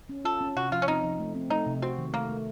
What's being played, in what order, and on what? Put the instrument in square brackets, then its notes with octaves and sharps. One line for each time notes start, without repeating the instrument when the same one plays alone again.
[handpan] C#4
[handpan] F4 [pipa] A4
[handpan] C#4
[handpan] C3 [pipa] F#4
[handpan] F3 [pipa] F4
[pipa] C#4
[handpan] C4 [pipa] D#4
[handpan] F3
A3
C4
[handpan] A3 [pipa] D#4
[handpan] C3
[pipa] C4 [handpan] F#4
[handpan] D#3
[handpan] A3 [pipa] A#3
[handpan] A3